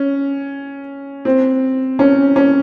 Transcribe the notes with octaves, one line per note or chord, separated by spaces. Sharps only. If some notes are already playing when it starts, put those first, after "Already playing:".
Already playing: C#4
C4
C#4
C#4